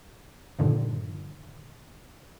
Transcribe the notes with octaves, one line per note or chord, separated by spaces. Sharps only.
G2 A#2 D3 D#3 F3